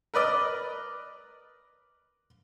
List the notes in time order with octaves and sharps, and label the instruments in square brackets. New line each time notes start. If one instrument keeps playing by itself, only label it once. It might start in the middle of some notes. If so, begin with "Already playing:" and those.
[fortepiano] A#4 B4 D5 D#5